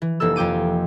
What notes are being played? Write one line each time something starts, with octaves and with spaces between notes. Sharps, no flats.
E3
F1 E3 A#3 A4 E6
F2 F3 G5 D6 D#7